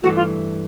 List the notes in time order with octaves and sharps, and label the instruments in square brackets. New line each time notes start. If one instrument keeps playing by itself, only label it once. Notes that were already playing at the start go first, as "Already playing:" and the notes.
[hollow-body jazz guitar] G2 E3 A3 [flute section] F#4
[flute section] F4